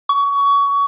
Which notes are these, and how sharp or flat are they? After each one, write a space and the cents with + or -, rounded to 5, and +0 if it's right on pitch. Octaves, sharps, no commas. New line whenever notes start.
C#6 +25